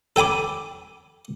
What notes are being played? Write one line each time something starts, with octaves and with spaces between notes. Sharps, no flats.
A4 G5 G#5 B5 D6